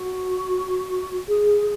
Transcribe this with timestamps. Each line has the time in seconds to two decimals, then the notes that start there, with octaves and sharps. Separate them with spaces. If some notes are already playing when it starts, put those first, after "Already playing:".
Already playing: F#4
1.28 G#4